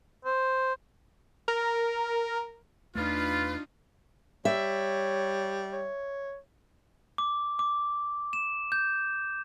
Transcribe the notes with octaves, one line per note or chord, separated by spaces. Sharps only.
C5
A#4
E2 A3 D4 D#4 F4 B4
G3 C#5 E5
C#5
D6
D6
E7
G6